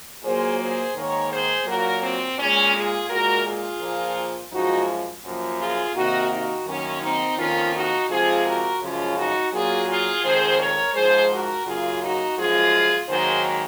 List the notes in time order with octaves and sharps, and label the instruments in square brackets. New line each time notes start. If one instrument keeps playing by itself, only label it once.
[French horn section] A#2 F#3 A#3 G#4 C5
G#4 C5
G#2 D#3 A#3 A#4 C#5
G#4 C5
A#2 F#3 A#3 F#4 A#4
C4
A#2 G#3 C#4
F4 G#4
A#2 G#3 F#4 A#4
F4 G#4
A#2 F3 A#3
F#2 F3 G#3 D#4 F#4
F#2 F3 A#3
F4 G#4
C3 D#3 A#3 D#4 F#4
D#4 F#4
F#2 D#3 F#3 A#3 C#4
C4 D#4
F2 D#3 A#3 C#4 F4
D#4 F#4
C3 F3 G#3 F4 G#4
F#4 A#4
F#2 C#3 F3 G#3 C#4 F4
D#4 F#4
A#2 F#3 A#3 F4 G#4
F4 G#4
F2 D#3 G#3 G#4 C5
A#4 C#5
G#2 F3 G#3 G#4 C5
F#4 A#4
F#2 C#3 F#3 A#3 F4 G#4
D#4 F#4
F#2 F3 G#3 F4 G#4
G#2 D#3 F#3 A#3 G#4 C5